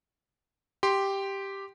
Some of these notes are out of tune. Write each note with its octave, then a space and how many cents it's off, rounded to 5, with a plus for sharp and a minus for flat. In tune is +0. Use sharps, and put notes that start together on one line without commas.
G4 +0 C6 +0